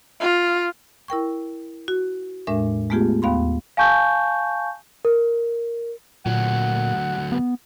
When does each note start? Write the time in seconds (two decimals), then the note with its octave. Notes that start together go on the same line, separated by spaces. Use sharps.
0.21 F4
1.08 E4 A#4 G5 C#6
1.88 F#4
2.47 E2 A2 G#3 D4 A#4 E5
2.90 G#3 A3 B3 F4 G4 G#4
3.22 D#2 B3 F5 B5 C6
3.77 F5 G#5 A5 C#6 G6
5.05 A#4
6.26 D2 A#2 F#3 F#5
7.32 B3